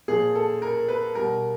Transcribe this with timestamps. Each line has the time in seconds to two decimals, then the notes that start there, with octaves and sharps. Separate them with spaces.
0.08 A#2 F3 G#4
0.35 A4
0.62 A#4
0.88 B4
1.15 B2 G3 A#4